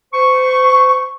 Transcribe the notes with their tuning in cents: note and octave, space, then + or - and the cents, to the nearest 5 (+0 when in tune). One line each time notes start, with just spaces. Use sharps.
C5 -35 C#6 +0